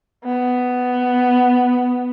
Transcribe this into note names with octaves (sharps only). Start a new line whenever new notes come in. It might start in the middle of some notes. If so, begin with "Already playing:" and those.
B3